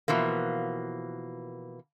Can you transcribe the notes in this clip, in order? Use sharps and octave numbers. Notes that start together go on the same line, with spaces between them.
B2 E3 F3 A#3